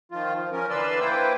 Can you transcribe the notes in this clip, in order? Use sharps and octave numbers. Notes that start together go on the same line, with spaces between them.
D#3 F3 F4
F3
F3 C#4 A#4
D3 E3 B4 D5 C6 E6
A#3 E4 B4 C5 G5